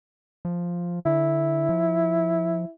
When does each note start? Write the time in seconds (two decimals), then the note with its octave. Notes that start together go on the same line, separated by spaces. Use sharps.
0.45 F3
1.05 D3 E4
1.69 F3